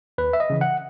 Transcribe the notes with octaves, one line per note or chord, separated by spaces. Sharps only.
D#2 B4
E5
D#5
C#3 E3
F#5